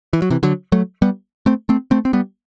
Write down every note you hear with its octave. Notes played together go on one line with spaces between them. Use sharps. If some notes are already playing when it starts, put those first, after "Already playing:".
E3
F#3
C3 E3
D3 F#3
F#3 A3
G3 B3
A3 C4
A3 C4
A3 C4
C4
G3 B3